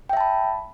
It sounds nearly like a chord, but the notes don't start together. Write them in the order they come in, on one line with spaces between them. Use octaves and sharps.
G5 E5 A5 B5